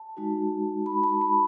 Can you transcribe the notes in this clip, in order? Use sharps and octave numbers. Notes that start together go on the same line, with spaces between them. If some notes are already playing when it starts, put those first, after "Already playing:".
Already playing: A5
G#3 D#4 F#4
B5
A5
B5